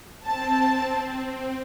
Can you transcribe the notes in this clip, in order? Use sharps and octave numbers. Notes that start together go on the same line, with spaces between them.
C4 A5